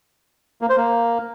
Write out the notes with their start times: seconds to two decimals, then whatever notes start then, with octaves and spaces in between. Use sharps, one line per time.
0.61 A#3
0.69 C5
0.77 A#3